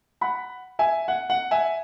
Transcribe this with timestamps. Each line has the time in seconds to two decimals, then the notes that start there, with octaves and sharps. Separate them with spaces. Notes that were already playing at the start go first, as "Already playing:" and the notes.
0.21 F#5 B5
0.79 E5 G#5
1.08 F#5
1.30 F#5
1.51 E5 G#5